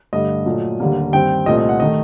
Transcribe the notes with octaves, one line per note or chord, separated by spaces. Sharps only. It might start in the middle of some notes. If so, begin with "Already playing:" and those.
G2 D3 A3 D#5
A#2 F#3 A3
D#2 D3 G3 A#3
G2 D#3 G3 C4 G5
C2 A#2 A3 C4 D#5
D#5
F#5
D#3 A3 D#5